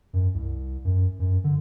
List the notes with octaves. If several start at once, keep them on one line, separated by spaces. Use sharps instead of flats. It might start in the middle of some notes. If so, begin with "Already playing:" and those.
F#2
C2
F#2
F#2
D3